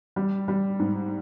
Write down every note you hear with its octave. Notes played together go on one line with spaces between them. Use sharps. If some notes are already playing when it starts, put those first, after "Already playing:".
G3
G3
G#2